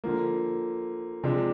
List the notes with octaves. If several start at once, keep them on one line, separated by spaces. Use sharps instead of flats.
D3 F3 A#3
C3 F3 G#3 D4